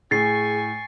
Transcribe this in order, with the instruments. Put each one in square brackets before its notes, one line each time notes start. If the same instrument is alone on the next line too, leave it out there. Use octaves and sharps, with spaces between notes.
[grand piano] A2 [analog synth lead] G#4 [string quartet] G#5 C#6 [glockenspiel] A6 C7